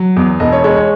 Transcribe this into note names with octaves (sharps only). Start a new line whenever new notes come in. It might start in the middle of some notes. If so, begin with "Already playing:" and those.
Already playing: F#3
E2
E1 D#5
C#5
G#3 C#5
C#5